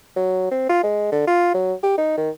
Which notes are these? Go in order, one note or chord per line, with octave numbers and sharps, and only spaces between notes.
F#3
C4
F4
G#3
D3
F4
F#3
G4
D#4
D#3